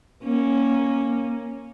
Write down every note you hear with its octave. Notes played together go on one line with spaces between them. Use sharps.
A#3 C#4